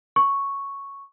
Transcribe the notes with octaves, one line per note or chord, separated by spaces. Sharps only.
C#6